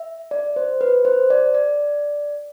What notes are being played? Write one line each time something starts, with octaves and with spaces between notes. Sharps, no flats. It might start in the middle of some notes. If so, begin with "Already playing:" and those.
Already playing: E5
D5
C5
B4
C5
D5
D5